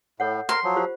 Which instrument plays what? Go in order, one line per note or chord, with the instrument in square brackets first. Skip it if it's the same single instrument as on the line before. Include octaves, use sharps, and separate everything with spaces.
[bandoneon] A2 [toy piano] A4 C#5 F#5
[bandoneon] A#4 [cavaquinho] C6
[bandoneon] F3 F#3
[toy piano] F4 G4 C5